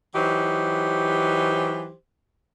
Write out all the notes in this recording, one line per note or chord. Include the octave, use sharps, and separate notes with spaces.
E3 F#3 D#4 G4 C5